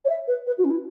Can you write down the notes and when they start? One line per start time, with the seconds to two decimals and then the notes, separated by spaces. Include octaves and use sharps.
0.05 C#5
0.09 E5
0.28 B4
0.47 B4
0.58 F#4
0.64 C#4
0.70 E4